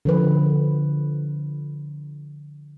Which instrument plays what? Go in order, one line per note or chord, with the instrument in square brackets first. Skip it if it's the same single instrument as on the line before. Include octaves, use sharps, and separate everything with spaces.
[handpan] D3 F3 B4